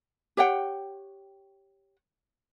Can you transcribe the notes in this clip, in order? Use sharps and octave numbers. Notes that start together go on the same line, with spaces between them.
G4 C#5 F#5 G5